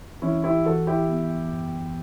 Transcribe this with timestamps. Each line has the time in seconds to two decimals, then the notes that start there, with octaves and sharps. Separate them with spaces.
0.22 E3 C#4 E4
0.44 E4 G4
0.65 E3 F#4 A4
0.87 E4 G4
1.09 B3
1.52 F#2